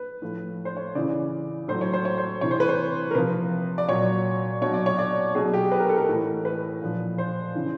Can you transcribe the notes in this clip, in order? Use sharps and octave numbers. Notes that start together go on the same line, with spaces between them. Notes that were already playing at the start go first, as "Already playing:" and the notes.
Already playing: B4
A2 F3
C5
C#5
C#3 E3 D5
A2 F#3 C5
C#5
C5
C#5
C5
C3 E3 C#5
C5
B4
C5
A#4
C3 F3 B4
D5
A#2 F#3 C#5
B2 F#3 C#5
D5
C#5
D5
B2 F#3 G#4
G4
B4
A#4
A4
A#4
A2 E3
B4
A#2 F3
C5
C#3 E3